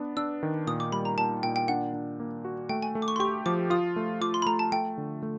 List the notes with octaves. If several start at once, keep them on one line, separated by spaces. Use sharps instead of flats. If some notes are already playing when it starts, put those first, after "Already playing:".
Already playing: B3 D4
D4 E6
D#3
A#2 D#6
D6
G3 B5
A#5
A#2 A5
A#2 G5
G5
D4 F#5
D4
A#3
F#4
A3 G5
G#5
A3
D6
C#6
C6
G4 C#6
F3 D6
F4 D#6
A3
F4 D6
C6
B5
A3 A#5
A5
A3 G5
D3
A3